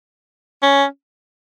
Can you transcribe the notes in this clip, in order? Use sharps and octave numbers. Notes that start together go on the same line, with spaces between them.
C#4